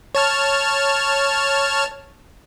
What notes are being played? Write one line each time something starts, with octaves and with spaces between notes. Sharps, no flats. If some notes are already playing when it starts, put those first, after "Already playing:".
C#5 A5 F6